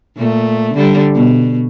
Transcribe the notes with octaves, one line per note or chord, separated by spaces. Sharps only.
A#2 A3
D3 G3
B2